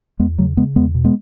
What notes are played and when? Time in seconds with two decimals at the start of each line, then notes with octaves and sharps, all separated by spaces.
0.19 E2 G#3 B3
0.38 C#3 F#3 A3
0.57 C#3 G#3 B3
0.76 E2 G#3 B3
0.95 B2
1.04 G#3 B3